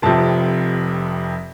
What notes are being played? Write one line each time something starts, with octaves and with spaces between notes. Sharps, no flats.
F1 F2 C3 F3 A5